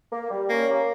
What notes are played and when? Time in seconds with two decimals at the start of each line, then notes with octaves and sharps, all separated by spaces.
0.12 A#3
0.30 G3
0.49 A#3 C#4
0.69 A#3